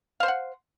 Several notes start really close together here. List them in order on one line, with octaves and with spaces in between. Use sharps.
F5 C5 C6 F#5